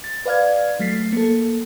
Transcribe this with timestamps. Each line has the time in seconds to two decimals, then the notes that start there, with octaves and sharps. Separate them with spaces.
0.04 A6
0.26 B4 D5 F5 F6 G#6
0.79 F#3 A3 A6 B6 C7
1.13 A#3 A4